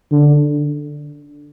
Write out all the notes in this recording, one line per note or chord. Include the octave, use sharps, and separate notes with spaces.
D3